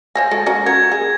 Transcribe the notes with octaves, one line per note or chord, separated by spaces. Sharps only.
C5 C#5 G#5 A#6
G#3 F#4 A4
C#4 F#4 A#4
F#4 A#4 G#6
G#4